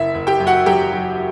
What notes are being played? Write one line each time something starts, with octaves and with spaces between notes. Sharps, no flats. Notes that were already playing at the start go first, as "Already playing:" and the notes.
Already playing: F#1 E4 E5
F#1
G4 G5
F#2
F#4 F#5
F#3 G4 G5
F#3